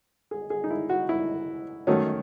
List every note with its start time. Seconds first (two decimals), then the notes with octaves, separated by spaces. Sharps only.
0.31 G#4
0.50 G#4
0.64 D#4
0.70 E4
0.89 F#4
1.09 E4
1.87 D#3 F#3 A3 C#4